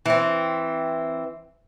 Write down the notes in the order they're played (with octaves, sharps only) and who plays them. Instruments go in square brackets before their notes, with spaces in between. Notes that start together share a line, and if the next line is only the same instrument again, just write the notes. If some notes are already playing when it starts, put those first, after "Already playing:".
[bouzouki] E3 C4